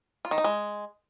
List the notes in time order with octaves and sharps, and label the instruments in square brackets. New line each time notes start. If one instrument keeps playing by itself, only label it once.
[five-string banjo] F4
D#3
D#4
G#3